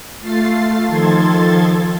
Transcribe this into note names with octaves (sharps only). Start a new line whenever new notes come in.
A3 F4 A6 C7
D#3 F3 A4 C6 G#6 A6